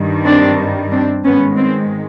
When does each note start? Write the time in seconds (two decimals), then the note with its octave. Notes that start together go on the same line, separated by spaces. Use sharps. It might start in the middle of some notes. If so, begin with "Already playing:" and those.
Already playing: G2 D#3 G3
0.25 C4 D4
0.91 C4 D4
1.24 G#2 D#3 G#3 B3 C#4
1.57 C4